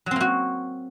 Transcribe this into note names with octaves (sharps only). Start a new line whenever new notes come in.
F#3 A#3 C4 F#4